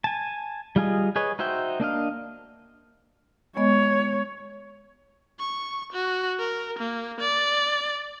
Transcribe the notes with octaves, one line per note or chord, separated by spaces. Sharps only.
G#5 A5
G3 F4 G#4 D#5
G#4 B4 C#5 D#5
D#4 F#4 C5 E5 G5
A#3 D4 D#5 F5
G#3 B3 C#5 D#5
C#6
F#4
A#4
A#3
D5